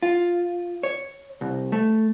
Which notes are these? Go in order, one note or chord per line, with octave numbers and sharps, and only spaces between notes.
F4
C#5
C2
A3